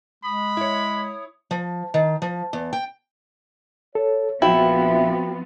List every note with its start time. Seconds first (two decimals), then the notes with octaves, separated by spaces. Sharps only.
0.24 G#3 B5 D#6
0.57 E4 C#5
1.51 F3
1.94 D#3
2.22 F3
2.53 E2
2.73 G5
3.95 A4 C#5
4.42 A#1 F3 B3 C4 E4 F#4 E5 G5